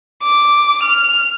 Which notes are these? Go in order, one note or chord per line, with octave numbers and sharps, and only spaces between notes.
D6
F6